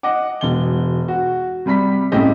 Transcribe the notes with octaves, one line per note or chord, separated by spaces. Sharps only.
D#5 F#5 D6
E1 G7
F#4
C3 G3 B5 B6
A2 C#3 C4 E4 G4 D#5